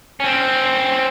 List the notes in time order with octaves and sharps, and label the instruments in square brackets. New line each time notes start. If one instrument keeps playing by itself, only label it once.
[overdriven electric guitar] C4 C#4